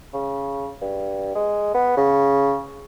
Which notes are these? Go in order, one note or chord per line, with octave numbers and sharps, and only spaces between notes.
C#3
G2
G#3
B3
C#3